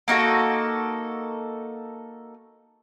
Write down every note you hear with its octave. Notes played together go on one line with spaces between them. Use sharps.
A#3 D#4 F#4 A4